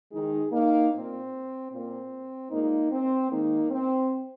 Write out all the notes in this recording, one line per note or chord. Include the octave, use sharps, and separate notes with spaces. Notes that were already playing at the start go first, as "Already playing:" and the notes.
D#3 G#3 D#4 G#4
A#3 D#4
A#2 A#3 C4
A#2 A#3 C4
A#2 G#3 A#3 D#4
C4
D#3 G#3 A#3 D#4
C4